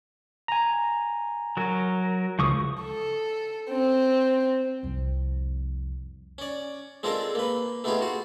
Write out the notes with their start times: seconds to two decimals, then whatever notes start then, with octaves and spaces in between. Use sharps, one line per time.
0.48 G#5 A#5
1.57 F#3 A#4
2.39 C#2 F3 C#6 D#6
2.83 A4
3.70 C4
4.83 C2 F2
6.38 C#4 D5
7.03 G#3 C4 D4 F4 A4 A#4
7.35 A#3 B4
7.84 A3 B3 D#4 F4 G4 G#4
8.01 F4 F#4